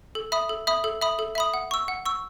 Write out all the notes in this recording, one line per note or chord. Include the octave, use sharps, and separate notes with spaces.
A4
E5 B5 D#6
A4
E5 B5 D#6
A4
E5 B5 D#6
A4
E5 B5 D#6
F#5
C#6 E6
F#5
C#6 E6